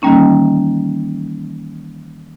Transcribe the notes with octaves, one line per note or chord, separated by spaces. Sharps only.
D#3 E3 G3 A#3 C#4 D#4